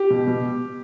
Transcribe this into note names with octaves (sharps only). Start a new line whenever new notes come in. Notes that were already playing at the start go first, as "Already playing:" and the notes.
Already playing: G4
B2
B2